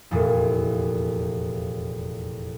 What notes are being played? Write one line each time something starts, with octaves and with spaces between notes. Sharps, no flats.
F1 E2 A#2